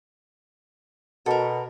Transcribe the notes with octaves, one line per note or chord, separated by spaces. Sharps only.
B2 A4 A#4